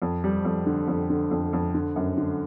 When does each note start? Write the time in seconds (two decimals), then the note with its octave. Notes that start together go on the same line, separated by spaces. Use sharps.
0.02 F2
0.24 G3
0.45 F2
0.66 D3
0.88 F2
1.10 D3
1.31 F2
1.53 F2
1.74 D3
1.96 F#2
2.17 D3